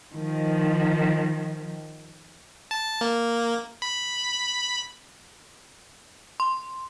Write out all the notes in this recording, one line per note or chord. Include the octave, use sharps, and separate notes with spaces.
D#3 F3
A5
A#3
B5
C6